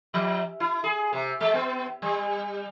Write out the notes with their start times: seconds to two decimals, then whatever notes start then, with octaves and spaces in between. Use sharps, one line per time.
0.14 F3
0.60 E4
0.84 G#4
1.13 C3
1.41 G#3
1.54 B3
2.02 G3